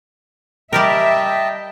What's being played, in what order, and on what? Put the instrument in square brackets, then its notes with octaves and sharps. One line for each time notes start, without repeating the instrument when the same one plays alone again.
[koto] G3 G4 A#4 [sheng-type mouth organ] D#5 G5 A5 [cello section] E5